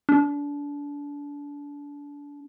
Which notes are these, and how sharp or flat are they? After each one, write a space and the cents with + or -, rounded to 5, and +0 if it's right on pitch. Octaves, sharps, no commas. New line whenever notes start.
D4 -30